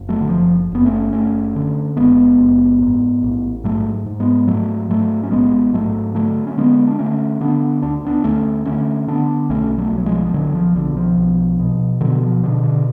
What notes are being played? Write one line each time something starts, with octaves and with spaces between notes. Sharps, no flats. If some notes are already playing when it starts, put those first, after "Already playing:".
Already playing: F#1
F#3 A3
D3
F#1 F3
F#1 B3
A3 C#4
F#1 A3 C#4
D3
F#1 G#3 B3
F#1
G#2
A1
G#2 F#3 A3
G#2
G#3 B3
G#2 F#3 A3
G#2 F#3 A3
C#4
A1 G#3 B3
G#2 F#3 A3
D3 F#3 A3
C#4
D3 G#3 B3
D4
D3 A3 C#4
D3 B3 D4
D2 D4
B3 D4
D2 A3 C#4
D3 A3 C#4
D3 B3 D4
B1 A3 C#4
F#3 A3
B1
F#3
F3 G#3
F3
B1 D3 F#3
F3
B1 D3
F3
B1
B2
B2 D3 F#3
F3
B2 D3
D3